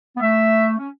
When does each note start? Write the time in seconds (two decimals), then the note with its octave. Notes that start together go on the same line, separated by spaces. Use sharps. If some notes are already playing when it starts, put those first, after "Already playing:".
0.16 B3
0.21 A3 E5
0.78 C#4